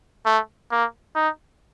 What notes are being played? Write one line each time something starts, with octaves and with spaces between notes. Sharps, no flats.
A3
A#3
D#4